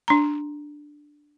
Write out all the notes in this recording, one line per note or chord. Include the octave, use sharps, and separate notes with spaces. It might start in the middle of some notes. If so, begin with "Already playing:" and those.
D4 A#5